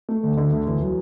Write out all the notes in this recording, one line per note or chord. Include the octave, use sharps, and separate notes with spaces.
A3
D2
D3
D2
E2
F#3